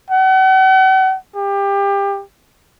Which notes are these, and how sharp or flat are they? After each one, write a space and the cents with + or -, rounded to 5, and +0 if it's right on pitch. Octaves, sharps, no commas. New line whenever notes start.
F#5 +40
G4 +25